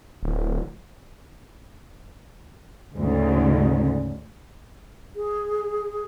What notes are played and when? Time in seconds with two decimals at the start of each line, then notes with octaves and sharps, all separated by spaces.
0.23 D1
2.97 D2 G#2 C#3
5.16 G#4